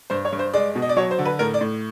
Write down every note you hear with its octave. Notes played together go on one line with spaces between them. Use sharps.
G2 C5
C#5
G2
C5
G#3 D5
B2
D#5
D5
F#3 C#5
C5
D3
B4
A2 A#4
D5
A2